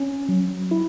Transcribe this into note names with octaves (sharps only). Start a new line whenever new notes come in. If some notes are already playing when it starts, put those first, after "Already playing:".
Already playing: C#4
F#3
E4